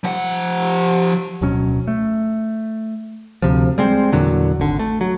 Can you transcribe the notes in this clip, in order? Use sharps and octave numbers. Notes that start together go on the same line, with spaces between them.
F3 F#5
D1 B2 F#3 C#4
A3
D2 C3 F3
G3 G#3 C4
E2 A#2 D3 F#3
G#1 D3
A3
F#3